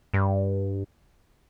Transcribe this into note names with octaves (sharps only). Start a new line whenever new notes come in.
G2